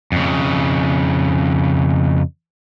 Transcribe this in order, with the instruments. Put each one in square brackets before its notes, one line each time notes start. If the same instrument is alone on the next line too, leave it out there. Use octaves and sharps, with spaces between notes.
[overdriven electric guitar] F2 C#3